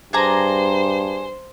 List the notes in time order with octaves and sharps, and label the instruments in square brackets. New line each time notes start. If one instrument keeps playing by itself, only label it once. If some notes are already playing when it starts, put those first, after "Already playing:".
[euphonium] G2 [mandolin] D4 G#4 A#5 [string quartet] C5